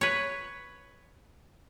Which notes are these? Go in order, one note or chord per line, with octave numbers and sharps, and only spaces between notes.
B4 C#5